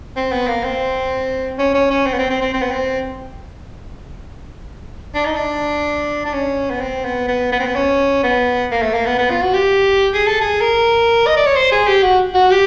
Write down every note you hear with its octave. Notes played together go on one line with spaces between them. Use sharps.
C4
B3
A#3
C4
C#4
C#4
C#4
C4
B3
C4
C4
C4
C4
B3
C4
D4
D#4
D4
D4
C#4
B3
C4
B3
B3
B3
C4
B3
C#4
B3
A#3
A3
A#3
B3
B3
F4
F#4
G4
G#4
A4
G#4
A#4
D#5
D5
C#5
C5
G#4
G4
F#4
F#4
G4